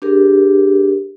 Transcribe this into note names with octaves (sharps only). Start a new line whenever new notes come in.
D4 G4 G#4 A#4